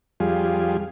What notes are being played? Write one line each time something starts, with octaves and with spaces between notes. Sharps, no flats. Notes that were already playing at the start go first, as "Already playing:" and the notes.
F2 G3 F4 G#4